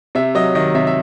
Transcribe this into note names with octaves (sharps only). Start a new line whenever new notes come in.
C3 E5
F#3 D#5
D#3 D#5
C3 E5
E5